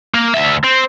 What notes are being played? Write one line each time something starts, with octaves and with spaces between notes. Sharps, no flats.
A#3
D2 E5
C4